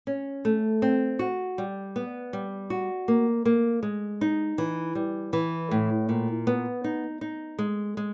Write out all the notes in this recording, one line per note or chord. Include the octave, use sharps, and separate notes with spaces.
C#4
A3
C4
F#4
G3
B3
G3
F#4
A#3
A#3
G#3
D#4
E3
G3
E3
A2
A#2
B3
D#4
D#4
G#3
G#3